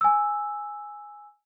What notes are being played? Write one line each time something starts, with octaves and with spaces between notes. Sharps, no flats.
G#5 E6